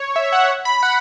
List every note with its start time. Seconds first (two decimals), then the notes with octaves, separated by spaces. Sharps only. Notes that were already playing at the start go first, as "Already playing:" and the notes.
Already playing: C#5
0.16 E5
0.32 F#5
0.65 B5
0.83 F#5